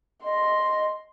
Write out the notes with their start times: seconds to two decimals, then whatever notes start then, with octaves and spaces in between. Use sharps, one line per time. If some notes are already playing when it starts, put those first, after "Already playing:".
0.24 D#5 C6